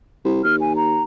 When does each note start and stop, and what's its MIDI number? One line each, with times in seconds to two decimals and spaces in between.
0.25 0.44 36
0.44 1.04 39
0.44 0.56 89
0.61 0.73 80
0.76 1.03 82